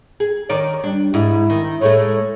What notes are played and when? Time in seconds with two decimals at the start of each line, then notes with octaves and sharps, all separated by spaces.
0.20 G#4
0.50 D#3 C#5 D5
0.84 G3 D4
1.14 G#2 E4
1.50 D#3
1.81 A2 G#3 A3 C#5